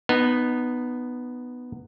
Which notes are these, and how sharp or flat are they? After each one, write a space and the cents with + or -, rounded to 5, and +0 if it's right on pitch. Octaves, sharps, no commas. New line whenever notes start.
B3 +0 D#4 -25